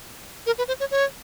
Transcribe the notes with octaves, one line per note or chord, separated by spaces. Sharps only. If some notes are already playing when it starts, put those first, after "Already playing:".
A#4
B4
C5
C#5
C#5